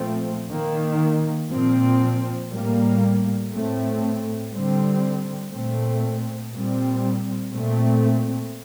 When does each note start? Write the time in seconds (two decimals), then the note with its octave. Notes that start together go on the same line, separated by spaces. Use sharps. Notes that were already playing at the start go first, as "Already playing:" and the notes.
Already playing: A#2 F3 A3 C4
0.50 D#3 A#3
1.50 A#2 F3 C4
2.51 A2 G3 A#3
3.52 A2 A3 C4
4.52 D3 G3 C4
5.52 A#2 A3 C4
6.53 A#2 G3 C4
7.52 A#2 A3 C4